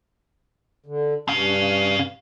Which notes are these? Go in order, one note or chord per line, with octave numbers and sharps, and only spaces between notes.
D3
G2 C#4 F5